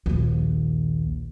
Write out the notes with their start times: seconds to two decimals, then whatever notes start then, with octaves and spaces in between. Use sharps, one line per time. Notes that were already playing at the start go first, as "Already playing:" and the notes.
0.06 A#1 D#2